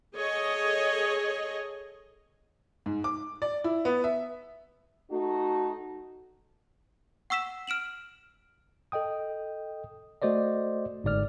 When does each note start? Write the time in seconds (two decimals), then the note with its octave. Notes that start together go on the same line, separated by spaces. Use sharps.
0.16 G#4 A4 C#5 D#5
2.86 G#2
3.04 D6
3.42 D5
3.64 E4
3.85 B3
4.04 E5
5.11 A3 D#4 F#4
7.30 F#5 C#6 E6 B6 E7
7.67 F6 D7 E7 F#7
8.92 A4 D#5 G5 D#6
10.22 A3 F#4 C5 D5 D#5
11.04 G1 G#2 D5 F6